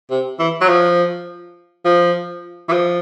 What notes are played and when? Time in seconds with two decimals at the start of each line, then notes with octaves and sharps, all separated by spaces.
0.11 C3
0.39 E3
0.61 F#3
0.69 F3
1.85 F3
2.69 E3
2.73 F3